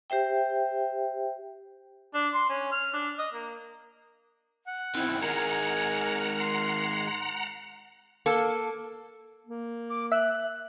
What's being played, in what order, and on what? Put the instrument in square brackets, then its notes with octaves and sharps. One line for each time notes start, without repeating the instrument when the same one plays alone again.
[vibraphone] G4 C5 E5 G5
[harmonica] D4
C6
C#4
F6
D4
D#5
A#3
[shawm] F#5
[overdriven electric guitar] F#2 D#3 [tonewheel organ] C4 [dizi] E4
[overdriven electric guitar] D#3 G#3 [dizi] A#4 [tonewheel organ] F#5 A#5 [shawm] G#5
[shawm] C6
[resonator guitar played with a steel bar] A#3 A4
[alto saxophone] A#3
[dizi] D6
[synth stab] E5 [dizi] F#6